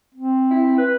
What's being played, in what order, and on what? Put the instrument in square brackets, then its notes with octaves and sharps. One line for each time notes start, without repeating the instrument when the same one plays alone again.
[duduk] C4
[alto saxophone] E4
B4